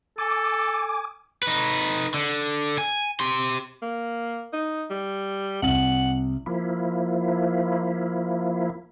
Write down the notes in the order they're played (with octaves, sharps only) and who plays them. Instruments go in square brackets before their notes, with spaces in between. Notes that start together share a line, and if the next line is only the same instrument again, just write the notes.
[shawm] A4 [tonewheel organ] G#5 D6
[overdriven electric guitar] D#4 B4
D3
G#5
G4 C6
[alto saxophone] A#3
D#4
G3
[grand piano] C2 F#7 [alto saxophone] F#5
[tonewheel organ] F3 A#3 E4